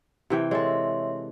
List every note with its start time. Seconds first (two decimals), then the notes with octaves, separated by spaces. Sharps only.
0.30 C3 E3 G5
0.51 G#3 A4 C#5 E5 C6